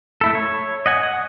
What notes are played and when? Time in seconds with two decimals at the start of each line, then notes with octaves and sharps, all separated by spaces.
0.21 A3 E4 A4
0.35 C#5
0.86 D#5 F#5 G#5
1.03 F#5